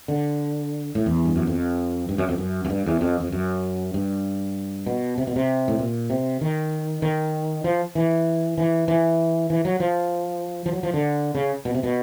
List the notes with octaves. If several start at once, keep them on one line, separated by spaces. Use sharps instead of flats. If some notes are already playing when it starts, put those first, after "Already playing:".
D3
A2
E2
G2
F#2
F2
G2
F#2
F2
F#2
F#2
G2
E2
F2
F2
F#2
G2
B2
C3
B2
C3
A2
A#2
C3
D#3
D#3
F3
E3
E3
E3
E3
F#3
F3
F3
F#3
F3
D3
C#3
B2
C3
B2